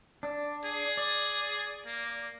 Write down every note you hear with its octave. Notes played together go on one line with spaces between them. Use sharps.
D4
G#4
D5
A#3